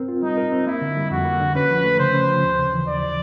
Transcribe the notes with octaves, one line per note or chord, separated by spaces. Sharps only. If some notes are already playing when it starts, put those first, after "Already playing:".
Already playing: C4 A#4
F4
G3 D#4
A#4
C4
A#3 E4
D3
G3
F2 F#4
A#3
D3
C#4 B4
F3
A3
C#3 C5
C#4
F3
D#2
C#3
E3
D#2 D5